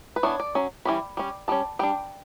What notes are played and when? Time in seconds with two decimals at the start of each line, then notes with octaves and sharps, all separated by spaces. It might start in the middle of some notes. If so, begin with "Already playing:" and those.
0.16 B4
0.23 E3 B3 D4 C#5
0.40 D5
0.55 F#3 C#4
0.85 E3 G3 C#4 B5
1.17 G3 C#4
1.48 G3 C#4 A5
1.79 G3 D4 G5